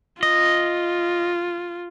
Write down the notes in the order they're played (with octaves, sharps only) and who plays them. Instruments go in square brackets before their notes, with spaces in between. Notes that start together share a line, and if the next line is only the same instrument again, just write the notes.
[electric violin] F4 [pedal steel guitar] D#5